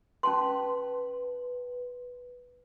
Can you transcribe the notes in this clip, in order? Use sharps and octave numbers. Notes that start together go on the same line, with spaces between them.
C#4 B4 A5 C6